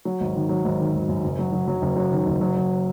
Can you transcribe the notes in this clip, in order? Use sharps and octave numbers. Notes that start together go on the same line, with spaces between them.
F#3
G#1
D#3
F#3
G#1
D#3
G#1
F#2
F#1
F#3
F#3
F#3
F#1
F#3
D#3
F#1
F#3
F#3